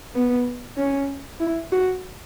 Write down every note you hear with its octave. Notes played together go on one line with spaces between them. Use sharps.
B3
C#4
E4
F#4